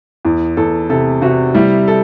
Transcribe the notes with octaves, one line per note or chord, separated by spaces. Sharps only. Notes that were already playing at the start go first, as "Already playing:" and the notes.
E2
E2 A4
C3 A4
C3 F#4
G3 E4
A4